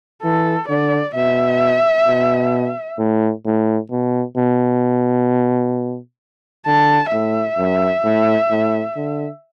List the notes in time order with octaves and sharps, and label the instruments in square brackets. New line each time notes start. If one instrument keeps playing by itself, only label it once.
[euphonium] E3 [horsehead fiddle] A4
[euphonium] D3 [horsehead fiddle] D5
[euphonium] B2 [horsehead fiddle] E5
[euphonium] B2
A2
A2
B2
B2
[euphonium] D3 [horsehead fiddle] A5
[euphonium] A2 [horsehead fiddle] E5
[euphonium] F#2
A2
A2
D3